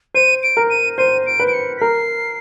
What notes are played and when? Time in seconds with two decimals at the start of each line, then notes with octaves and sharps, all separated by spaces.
0.14 C5 D#7
0.43 D7
0.57 A#4
0.70 D#7
0.98 C5 D#7
1.26 D7
1.40 B4
1.48 D7
1.53 C#7
1.77 B6
1.81 A#4 C7